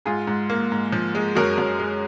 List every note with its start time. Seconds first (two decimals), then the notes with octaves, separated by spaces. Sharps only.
0.06 G#2 F4 G#4
0.27 G#2
0.50 A#3
0.72 G#2
0.92 F3
1.15 G#3
1.35 F#2 F#4 A#4
1.58 F#2
1.79 G#3